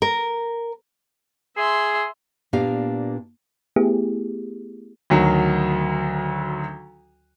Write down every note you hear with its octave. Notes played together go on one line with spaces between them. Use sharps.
A#4
G#4 E5 C6
A#2 A#3 B3 D4 G4 F5
A3 B3 E4 G4 G#4
D2 D#3 F#3